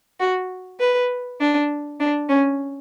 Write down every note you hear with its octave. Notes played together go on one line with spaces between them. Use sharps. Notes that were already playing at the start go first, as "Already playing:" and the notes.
F#4
B4
D4
D4
C#4